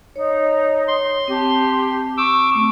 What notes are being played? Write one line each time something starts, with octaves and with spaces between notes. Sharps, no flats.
D#4 C#5
C#5 C6
C4 G4 A5
C#6 D6 E6
A3 C4